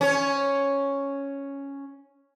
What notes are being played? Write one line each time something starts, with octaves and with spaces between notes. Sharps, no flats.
C#4 C#5